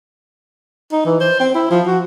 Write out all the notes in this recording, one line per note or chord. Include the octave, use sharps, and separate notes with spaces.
D#4
E3
C5
C4
E4
F3
F#4